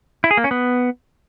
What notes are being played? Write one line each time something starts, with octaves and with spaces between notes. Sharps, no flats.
E4
G#4
A#3
C#4
B3